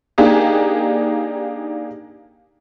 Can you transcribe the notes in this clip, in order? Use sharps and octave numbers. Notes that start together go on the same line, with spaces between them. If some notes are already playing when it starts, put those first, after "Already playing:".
A#3 D4 D#4 G4 G#4